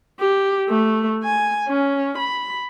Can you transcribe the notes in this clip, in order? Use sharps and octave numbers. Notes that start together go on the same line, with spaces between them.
G4
A3
G#5
C#4
B5